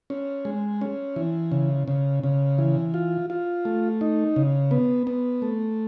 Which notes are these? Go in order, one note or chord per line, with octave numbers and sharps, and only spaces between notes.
C#4
G#3
C#4
E3
C#3
C#3
C#3
E3
F4
F4
A3
D#4
C#3
B3
B3
A3